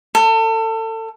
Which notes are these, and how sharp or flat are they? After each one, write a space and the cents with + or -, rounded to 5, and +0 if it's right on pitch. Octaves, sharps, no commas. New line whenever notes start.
A4 +30